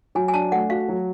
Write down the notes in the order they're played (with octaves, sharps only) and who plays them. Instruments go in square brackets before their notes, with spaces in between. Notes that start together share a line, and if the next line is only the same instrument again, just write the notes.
[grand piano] F#3 [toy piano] G#5
[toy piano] G#5
[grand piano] D4 [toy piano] A5
[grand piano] A3 [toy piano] F#5
[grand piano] F#4 [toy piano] F5
[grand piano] F#3